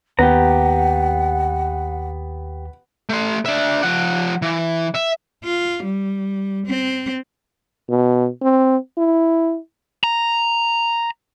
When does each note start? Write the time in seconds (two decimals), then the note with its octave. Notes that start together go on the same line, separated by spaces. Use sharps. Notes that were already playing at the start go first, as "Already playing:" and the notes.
0.19 D#2 B3 G4 F#5 A#5
3.10 A3 C6
3.46 D4 E5
3.83 F3 F#5
4.42 E3
4.94 E5
5.44 F4
5.84 G3
6.66 C4
7.90 B2
8.42 C4
8.98 E4
10.04 A#5